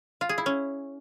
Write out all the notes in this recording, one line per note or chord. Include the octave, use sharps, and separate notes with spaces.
F4
G#4
E4
C#4